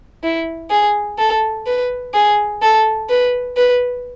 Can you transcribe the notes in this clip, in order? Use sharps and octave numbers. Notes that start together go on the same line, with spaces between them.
E4
G#4
A4
B4
G#4
A4
B4
B4